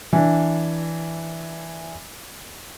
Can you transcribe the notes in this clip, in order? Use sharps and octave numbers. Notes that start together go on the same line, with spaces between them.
E3 D4